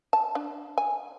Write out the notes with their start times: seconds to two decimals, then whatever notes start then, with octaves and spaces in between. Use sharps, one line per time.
0.13 A5
0.35 D4
0.78 G#5